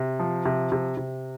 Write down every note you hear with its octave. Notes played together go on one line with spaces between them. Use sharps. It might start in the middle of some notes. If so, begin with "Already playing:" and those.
Already playing: C3
F3
C3
C3
C3